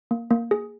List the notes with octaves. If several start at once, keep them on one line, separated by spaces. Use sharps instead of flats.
A#3
A#3
G#4